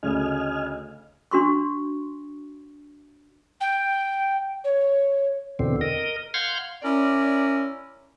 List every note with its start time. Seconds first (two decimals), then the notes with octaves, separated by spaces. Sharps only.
0.03 D2 C#3 D#5 G#5 F6
1.31 D4 F#4 C6 C#6
3.60 G5
4.64 C#5
5.59 E2 B2 D3 C4
5.81 A#4 D#5
6.34 F5 F#5 C6 F6 G6 G#6
6.83 C#4 E4 A#4 D5